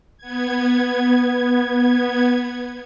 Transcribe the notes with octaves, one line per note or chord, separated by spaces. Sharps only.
B3 G#6